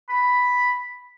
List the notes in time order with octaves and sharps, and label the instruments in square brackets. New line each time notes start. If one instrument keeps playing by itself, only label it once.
[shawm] B5